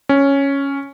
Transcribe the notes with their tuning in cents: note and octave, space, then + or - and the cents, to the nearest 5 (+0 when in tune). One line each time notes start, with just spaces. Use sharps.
C#4 +0